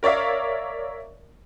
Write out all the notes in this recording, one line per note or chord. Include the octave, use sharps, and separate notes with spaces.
A#4 C#5 D5 E5 F5